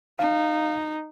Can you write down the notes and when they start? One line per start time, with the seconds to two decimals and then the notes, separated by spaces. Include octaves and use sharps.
0.19 D#4 F5